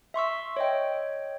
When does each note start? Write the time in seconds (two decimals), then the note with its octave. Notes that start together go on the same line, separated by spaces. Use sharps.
0.14 E5 C6 C#6 E6
0.57 C#5 D#5 G5